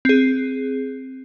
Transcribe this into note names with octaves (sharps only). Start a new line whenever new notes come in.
C4 G#4